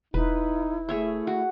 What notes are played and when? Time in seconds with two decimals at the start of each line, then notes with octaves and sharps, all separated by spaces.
0.14 E1 D#4 E4 B4
0.89 A3 G#4 C#5 E5
1.27 F#4